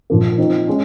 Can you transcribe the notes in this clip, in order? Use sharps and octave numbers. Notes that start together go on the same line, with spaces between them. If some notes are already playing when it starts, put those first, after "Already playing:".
A#2 F3 A#3
F3 C4 D#4
G#3 C#4